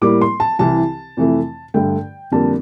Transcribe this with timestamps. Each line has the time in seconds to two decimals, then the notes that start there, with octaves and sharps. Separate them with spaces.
0.02 A2 G3 A#3 D6
0.21 C6
0.40 A5
0.59 C2 C3 E3 A5
1.17 F2 C3 E3 A3
1.74 G2 D3 A3 G5
2.32 F2 D3 G3 A#3 A5